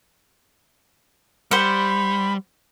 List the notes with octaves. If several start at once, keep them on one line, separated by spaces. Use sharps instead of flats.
G3 C5 F#5 B5